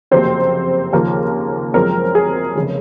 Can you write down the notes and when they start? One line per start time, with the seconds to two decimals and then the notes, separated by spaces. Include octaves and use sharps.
0.11 F#1 F2 C3 F#3 A#3 C4 C5
0.93 D#2 C#3 F3 A#3 A#4
1.74 F#2 F3 G#3 C4 A#4
2.15 G#4
2.55 F1 C#3